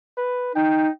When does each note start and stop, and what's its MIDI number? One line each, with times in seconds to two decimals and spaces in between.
0.17 0.54 71
0.55 0.89 63
0.55 0.91 79